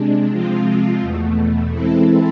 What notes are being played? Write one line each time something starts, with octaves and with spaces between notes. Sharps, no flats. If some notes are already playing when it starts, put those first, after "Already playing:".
Already playing: C3 G#3 D4
C3 F3 G#3 C4 F4
E2 B2 A3
E3 G#3 C4 E4 A4